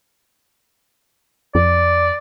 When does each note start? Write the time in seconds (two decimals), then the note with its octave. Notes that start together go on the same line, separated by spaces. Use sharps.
1.55 F2 D5